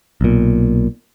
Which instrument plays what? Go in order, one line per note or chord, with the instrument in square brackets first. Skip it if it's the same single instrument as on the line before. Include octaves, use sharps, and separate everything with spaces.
[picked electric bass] B1 A#2